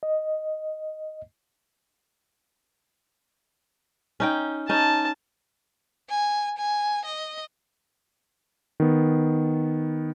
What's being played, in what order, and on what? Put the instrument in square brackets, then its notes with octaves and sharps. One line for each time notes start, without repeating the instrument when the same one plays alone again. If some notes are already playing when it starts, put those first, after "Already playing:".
[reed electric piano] D#5
[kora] C#4 D#4 G5
[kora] C#4 D#4 [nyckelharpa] A5
[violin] G#5
G#5
D#5
[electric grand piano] D#3 B3